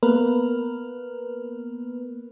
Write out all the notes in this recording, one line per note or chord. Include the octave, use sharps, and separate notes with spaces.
A#3 B3 A#4 B4